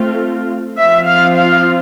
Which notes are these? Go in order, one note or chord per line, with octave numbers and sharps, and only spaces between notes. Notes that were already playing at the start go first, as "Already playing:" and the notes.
Already playing: A3 C4 F4
F3 C4 F4 E5
F5
F5